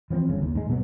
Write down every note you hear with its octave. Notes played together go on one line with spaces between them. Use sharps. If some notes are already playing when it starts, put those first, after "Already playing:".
E3 F3 B3 C4
G1 C#3
D#2
G#2 G#3
B2 F#3 B3